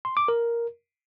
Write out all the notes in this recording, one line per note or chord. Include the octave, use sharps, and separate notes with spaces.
C6
D6
A#4